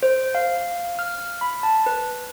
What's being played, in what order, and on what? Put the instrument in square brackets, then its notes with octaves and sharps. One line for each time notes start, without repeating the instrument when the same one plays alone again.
[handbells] C5
F5
F6
B5
A5
B4